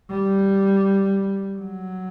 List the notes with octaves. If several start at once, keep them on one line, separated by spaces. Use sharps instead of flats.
G3
F#3